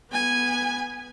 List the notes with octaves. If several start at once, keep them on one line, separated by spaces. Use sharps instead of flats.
B3 G#5